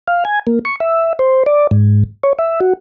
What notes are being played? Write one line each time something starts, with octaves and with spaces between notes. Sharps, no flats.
F5
G#5
A#3
C#6
E5
C5
D5
G#2
C#5
E5
F#4